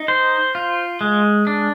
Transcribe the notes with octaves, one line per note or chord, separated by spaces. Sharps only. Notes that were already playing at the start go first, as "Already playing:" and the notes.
Already playing: D#4
C5
F4
G#3
D4